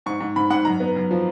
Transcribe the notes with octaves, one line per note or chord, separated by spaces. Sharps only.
G#2 C#6
G#2
G#2 B5
G#2 F#5
F#2 A#5
B3
F#2
F3